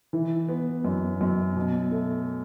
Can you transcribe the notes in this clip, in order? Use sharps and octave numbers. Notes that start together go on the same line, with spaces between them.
E3
B3
F#2
F#2
B2
A3